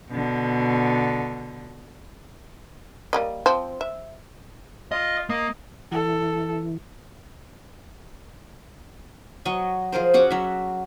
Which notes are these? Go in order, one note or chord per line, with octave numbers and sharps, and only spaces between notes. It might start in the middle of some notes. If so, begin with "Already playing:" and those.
B2 D3
G3 A#3 D#5
F3 C4
E5
F4 D#5
A#3 D#5
E3 A4
F#3 D#5 C#6
F3 G#4 A#4 C5
C#4 F#4 F#5 D6
F#3 E5